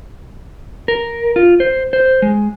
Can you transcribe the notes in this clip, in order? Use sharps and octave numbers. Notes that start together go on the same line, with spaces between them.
A#4
F4
C5
C5
G#3